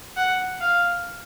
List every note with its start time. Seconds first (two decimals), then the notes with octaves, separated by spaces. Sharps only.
0.17 F#5
0.61 F5